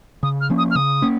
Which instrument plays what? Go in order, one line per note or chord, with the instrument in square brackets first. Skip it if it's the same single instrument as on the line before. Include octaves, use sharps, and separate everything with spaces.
[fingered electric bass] C#3 [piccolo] D#6
[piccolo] F6
[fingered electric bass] F3 A#3 C#4
[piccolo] D#6
F6
[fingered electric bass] C#3 [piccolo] D#6
[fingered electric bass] A#3 C#4